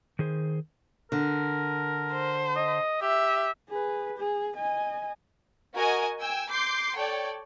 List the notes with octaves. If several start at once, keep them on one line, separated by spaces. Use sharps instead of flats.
D#3 G#4 C5
D3 A#4
C5
D#5
G4 E5
G#4 B4
G#4
D#5 G#5
F#4 A#4 D#5 G#5
G5 G#5 E6
C6 D6 G6 C7
A4 C#5 D5 G5